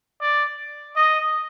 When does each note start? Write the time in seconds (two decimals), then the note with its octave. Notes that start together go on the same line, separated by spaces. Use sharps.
0.21 D5
0.96 D#5